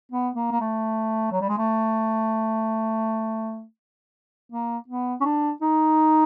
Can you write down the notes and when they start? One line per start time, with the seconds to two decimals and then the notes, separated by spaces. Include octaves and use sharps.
0.12 B3
0.36 A#3
0.51 A#3
0.61 A3
1.32 F#3
1.41 G3
1.49 G#3
1.58 A3
4.52 A#3
4.88 B3
5.21 C#4
5.25 D4
5.62 D#4